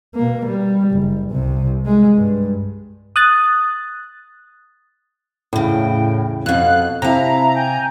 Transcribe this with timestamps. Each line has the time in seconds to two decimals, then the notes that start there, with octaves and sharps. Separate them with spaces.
0.15 B2 A#3
0.46 G3
0.92 F#1
1.31 C2 C3
1.86 G#3
2.15 G2
3.16 D#6 F#6 A6
5.53 E2 A2 C#3 G5
6.46 F2 B2 A4 F5 F#6
7.02 C3 E4 F5 A5 A#5
7.53 G5 G#5 G6